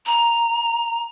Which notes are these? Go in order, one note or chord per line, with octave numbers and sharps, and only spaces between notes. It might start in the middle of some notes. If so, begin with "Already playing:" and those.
A#5